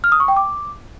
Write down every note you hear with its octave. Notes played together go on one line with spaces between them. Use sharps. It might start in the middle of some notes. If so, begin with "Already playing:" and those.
F6
D#6
C#6
G5
D6